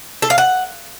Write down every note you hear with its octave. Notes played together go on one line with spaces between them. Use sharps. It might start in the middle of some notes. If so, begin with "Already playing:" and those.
A4
F5
F#5